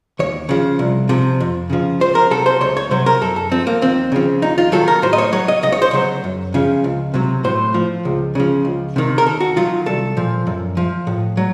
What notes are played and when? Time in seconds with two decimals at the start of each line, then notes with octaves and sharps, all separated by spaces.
0.19 D#2 C#5
0.49 C#3 F3
0.79 C2
1.09 C3 F3
1.40 F2
1.70 C#3 F3
2.00 C#2 C5
2.15 A#4
2.31 C3 F#3 A4
2.46 C5
2.61 C#2 C#5
2.77 C#5
2.91 C3 F#3 C5
3.06 A#4
3.21 F#2 A4
3.36 A4
3.52 F3 C4
3.67 A#3
3.82 D#2 C4
4.12 C#3 F3
4.42 D#2 D#4
4.58 F4
4.72 D#3 F#3 A4
4.88 A#4
5.02 A2 C5
5.13 D#5
5.18 C#5
5.32 F#3 C#5
5.48 D#5
5.63 C#2 D#5
5.72 C#5
5.82 C5
5.91 C#3 F#3 C#5
6.24 F#2
6.54 C#3 F3
6.84 C#2
7.14 C3 F#3
7.44 A2 C5
7.74 F3
8.05 C#2
8.35 C#3 F3
8.65 C#2
8.96 C3 D#3
9.18 A#4
9.26 D#2 A4
9.40 F#4
9.56 D#3 F#3 F4
9.86 C2 A4
10.17 A#2 F3
10.47 F#2
10.77 F3
11.07 A2
11.37 F#3